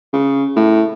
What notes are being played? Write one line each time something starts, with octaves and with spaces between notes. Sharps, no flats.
C#3
A2